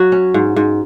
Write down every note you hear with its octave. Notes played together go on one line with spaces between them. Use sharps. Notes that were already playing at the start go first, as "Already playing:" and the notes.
Already playing: F#3 F#4
C#4
G#2
G#2